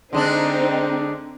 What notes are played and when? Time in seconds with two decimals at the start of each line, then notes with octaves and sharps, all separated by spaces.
0.13 D3 G#3 C4 D4 D#4